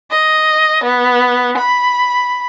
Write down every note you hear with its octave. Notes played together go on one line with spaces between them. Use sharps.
D#5
B3
B5